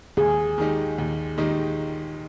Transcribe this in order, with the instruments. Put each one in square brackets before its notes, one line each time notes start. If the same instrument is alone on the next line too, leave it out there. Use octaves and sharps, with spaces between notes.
[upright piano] D#2 [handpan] G#4
[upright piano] D#3 G#3 D#4 G4
D#2
D#3 G#3 D#4 G4